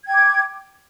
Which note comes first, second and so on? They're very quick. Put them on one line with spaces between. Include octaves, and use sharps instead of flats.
G#6 G5 D6